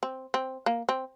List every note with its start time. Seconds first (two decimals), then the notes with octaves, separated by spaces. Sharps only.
0.03 C4
0.34 C4
0.66 A#3
0.89 C4